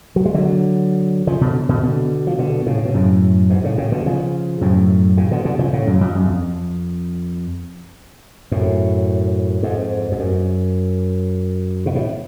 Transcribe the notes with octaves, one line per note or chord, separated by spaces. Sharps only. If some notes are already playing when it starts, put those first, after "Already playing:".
F#3
G#3
D3 F#3
C#3 F3
B2 D3
B2 D3
B2 D3
F3
B2 D3
A2 C#3
B2
F#2 A2
G#2 B2
A2 C#3
A2 C#3
B2 D3
C#3 F3
F#2 A2
A2 C#3
B2 D3
B2 D3
C#3 F3
A2 C#3
F#2
F2
F#2
F2
F#2 A2
F2 G#2
F2
F#2
B2
A2